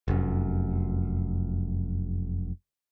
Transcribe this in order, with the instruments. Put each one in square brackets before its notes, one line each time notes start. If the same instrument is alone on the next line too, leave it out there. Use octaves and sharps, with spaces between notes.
[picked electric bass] F1 F#2